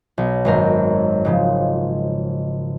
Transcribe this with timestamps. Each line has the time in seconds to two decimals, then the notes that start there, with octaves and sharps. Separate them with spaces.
0.18 B1
0.45 G#1 F#2 A#4
1.25 G#2 C#3 F3